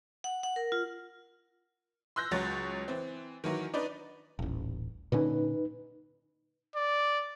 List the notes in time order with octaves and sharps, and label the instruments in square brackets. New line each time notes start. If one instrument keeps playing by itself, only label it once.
[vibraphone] F#5
F#5
A#4
F4
[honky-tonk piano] C6 E6 F#6 G6 A#6
C#2 F#3 C#5 A6
E3 C4
D#3 E3 F#3
D4 D#4 B4 D5
[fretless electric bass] D#1 A1
[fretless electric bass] A#2 D3 C#4 [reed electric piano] D#4 B4
[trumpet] D5